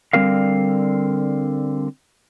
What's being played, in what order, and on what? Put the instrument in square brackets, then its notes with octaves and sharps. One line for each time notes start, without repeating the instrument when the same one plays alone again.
[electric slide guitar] D3 G3 C4 F#4 A#4 F5